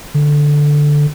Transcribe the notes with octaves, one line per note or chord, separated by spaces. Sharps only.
D3